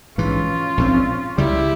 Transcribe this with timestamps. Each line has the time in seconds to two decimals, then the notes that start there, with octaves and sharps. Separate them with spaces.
0.18 A#1 G#2 E3 C#4 F4
0.77 A#1 G#2 F3 C4
1.37 C#2 C#3 G3 E4 G4